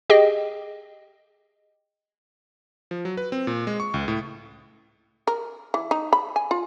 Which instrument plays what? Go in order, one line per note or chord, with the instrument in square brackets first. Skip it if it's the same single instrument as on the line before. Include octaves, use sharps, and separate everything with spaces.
[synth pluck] G4 G#4 D#5 G5
[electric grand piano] F3
F#3
B4
C4
A#2
G#3
C#6
C#2
A2
[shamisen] A#4
E3
D#4
B5
G#5
F4